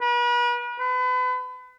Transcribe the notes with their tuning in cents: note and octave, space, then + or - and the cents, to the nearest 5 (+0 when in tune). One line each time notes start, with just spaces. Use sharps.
B4 -40
B4 +35